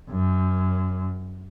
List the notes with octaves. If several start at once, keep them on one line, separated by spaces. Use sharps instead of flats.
F#2